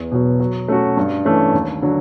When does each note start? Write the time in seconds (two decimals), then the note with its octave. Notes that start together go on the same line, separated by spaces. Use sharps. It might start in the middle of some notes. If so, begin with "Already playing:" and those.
Already playing: E2
0.12 B2 F#3
0.40 F#3
0.68 A3 C#4 F#4
0.97 G2
1.25 E3 A3 C#4
1.54 D#2
1.82 D3 F#3